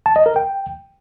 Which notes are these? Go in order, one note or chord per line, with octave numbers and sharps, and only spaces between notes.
A5
D#5
A#4
G5